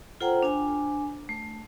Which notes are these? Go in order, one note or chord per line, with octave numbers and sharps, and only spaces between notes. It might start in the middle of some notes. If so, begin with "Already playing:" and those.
F4 A4 C5 F#5 G5 A#5
D4 G#5
A3